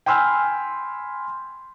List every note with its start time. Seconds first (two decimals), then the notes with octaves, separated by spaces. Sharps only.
0.06 G5 G#5 B5 C6 E6 F6